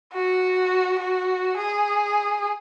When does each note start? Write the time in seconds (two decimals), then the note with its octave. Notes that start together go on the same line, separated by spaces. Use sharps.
0.14 F#4
0.99 F#4
1.57 G#4